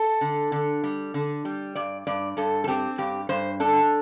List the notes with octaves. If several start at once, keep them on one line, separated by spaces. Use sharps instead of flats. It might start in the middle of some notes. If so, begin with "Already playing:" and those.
Already playing: A4
D3
D3
G3
D3
G3
G2 D5
G2 D5
G2 A4
A4
C4 G4
G2 G4
G2 C5
D4 A4